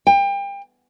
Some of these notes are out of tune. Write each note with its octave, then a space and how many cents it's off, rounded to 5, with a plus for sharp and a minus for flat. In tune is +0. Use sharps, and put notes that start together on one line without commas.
G5 +30